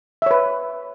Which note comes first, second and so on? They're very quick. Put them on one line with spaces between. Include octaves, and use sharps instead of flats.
E5 C#5 B4